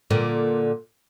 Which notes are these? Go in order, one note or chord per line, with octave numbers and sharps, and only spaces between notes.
A#2 D3